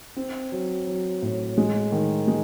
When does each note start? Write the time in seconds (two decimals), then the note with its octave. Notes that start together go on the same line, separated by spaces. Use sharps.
0.16 C4
0.52 F#3
0.87 F#3
1.22 A2
1.58 G#3
1.92 D#3
2.28 G#3